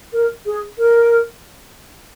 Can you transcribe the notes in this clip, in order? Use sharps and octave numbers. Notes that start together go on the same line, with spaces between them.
A#4
G#4
A#4